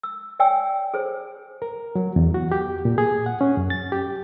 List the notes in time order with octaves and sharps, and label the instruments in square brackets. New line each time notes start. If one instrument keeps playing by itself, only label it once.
[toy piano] E6
C#5 D5 G5 G#5 E6
G#4 C5 C#5
[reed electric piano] A#4
F#3
E2
F#4
G4
A#2
G#4
F#5
C#4
F#2
A6
G4